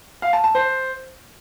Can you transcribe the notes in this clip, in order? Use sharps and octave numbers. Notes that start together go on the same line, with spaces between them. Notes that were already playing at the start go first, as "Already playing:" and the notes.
F5
A5
A5
C5